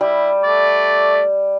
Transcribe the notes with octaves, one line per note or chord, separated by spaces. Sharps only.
G3 E4
A3 D5